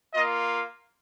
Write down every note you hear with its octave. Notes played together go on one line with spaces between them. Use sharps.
A#3 F4 D#5